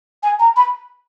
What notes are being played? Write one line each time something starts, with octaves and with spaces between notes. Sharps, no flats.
G#5
A#5
B5